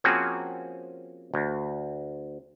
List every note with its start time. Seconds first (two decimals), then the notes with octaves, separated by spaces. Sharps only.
0.04 F3 A#3 C4 C#4 F#4 G#4
1.34 D2